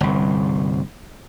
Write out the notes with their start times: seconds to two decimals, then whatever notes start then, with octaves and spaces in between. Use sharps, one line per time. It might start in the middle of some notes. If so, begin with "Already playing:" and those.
0.01 G1 C2